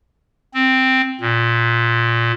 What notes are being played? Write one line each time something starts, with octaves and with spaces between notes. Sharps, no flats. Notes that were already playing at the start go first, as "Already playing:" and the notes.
C4
A#2